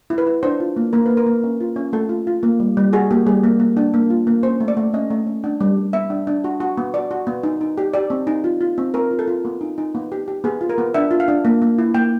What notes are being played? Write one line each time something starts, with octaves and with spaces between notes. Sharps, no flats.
E4
B4
E4
D4 C5
F4
A#3
A#3 A#4
A#3 B4
A#4
A#3
C#4
F4
C#4
A3 A4
F4
F4
A#3
G3
G3
F#4 G#4
A#3 G4
G3 G#4
A#3
A#3
D4
A#3
F4
A#3
C#4 C5
A3
D5
A3
C#4 D#5
A3
C#4
D4
G3
G3
B3 E5
D4
D4
F#4
F#4
B3
F#4 D5
F#4
B3
D#4
D#4
G4
G4 D5
C4
D#4
F4
F4
C4
C4 A#4
F4
A4
F4
B3
D#4
D#4
B3
G4
G4
B3 G#4
F4
A#4
B3
D4 E5
F4
F5
D4
A#3
A#3
E4
A#3 G5